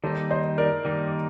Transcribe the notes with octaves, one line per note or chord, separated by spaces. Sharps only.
D#3 G3 A#3 D#4 A4 C5
C5 D#5
A#4 D5
D#3 G3 A#3 D#4